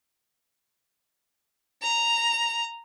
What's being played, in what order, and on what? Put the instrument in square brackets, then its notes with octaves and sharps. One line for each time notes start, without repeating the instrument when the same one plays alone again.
[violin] A#5